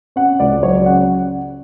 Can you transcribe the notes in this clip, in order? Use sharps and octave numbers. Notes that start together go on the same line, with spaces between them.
C#4 F#5
C#2 D5
F#3 C#5
D5
C#3 F#5